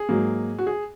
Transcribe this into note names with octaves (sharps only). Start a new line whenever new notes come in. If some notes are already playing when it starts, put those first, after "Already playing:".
Already playing: G#4
G#2 F#3 A#3
F#4
G#4